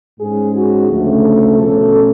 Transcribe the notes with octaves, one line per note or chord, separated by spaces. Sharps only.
G#2 G#3 C#4 G#4
F#4
D2 C#3 F3 A3
A4
B2 A3 C#4 A4